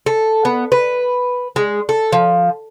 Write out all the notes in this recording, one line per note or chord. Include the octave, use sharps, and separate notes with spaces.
A4
B3
B4
G#3
A4
F3